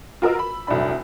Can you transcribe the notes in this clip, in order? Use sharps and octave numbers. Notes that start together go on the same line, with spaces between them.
F4 F#4 A#4 B4 D#5 E6
B5
F1 C2 F#3 D4 B5